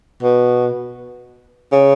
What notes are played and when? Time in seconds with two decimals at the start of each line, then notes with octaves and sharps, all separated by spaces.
0.22 B2
1.72 C#3